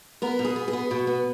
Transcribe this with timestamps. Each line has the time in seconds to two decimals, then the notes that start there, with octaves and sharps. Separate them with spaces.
0.22 B3 A#4
0.39 B2
0.45 G#4
0.56 B3
0.68 G#4
0.73 B3
0.91 B2
1.07 B3